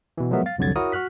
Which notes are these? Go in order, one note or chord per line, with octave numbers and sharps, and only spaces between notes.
B2 E3
F3 F#3 G#3 B3 A#4 E5
F5 A6
C2 F2 D3 F#3 G#6 A6
E4 F#4 A#4 C#5 D#6
F#4 F6 F#6 B6